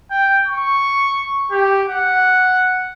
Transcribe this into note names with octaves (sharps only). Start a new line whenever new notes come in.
G5
C#6
G4
F#5